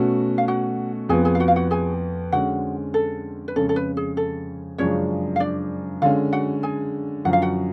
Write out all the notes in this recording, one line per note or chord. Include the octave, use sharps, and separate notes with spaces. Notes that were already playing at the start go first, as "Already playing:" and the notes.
Already playing: B2 A3 C#4 F#4
F5
F#4 F#5
F2 F3 B3 G#4 G#5
G#4 G#5
F5
F#4 F#5
F5
F#4 F#5
G#4 G#5
D3 G#3 C#4 F#4 F#5
A4
B4
F2 C#3 G#3 C#4 A4
A4
B4
G#4
A4
F#2 C#3 F3 G#3 C#4 D4 C#5
F5
D4 D5
D3 G#3 C#4 F4 F5
F#4 F#5
G#4 G#5
F#2 D3 F3 F#5
F5
F#4 F#5